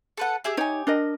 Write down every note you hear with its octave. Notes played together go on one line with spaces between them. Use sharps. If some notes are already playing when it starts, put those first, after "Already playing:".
A4 B4 F#5
G4 G#4 E5
D#4 G4 C#5 G#5
D4 A#4 D#5